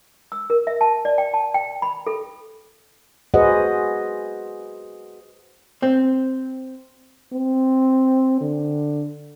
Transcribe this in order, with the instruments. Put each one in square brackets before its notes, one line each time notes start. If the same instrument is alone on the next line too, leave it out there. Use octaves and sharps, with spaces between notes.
[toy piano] E6
A#4
E5
A5
D5
G5
A5
G5
B5
A4
[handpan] F#4 G#4 B4 C5 D#5 F#5
[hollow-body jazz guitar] C4
[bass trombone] C4
D3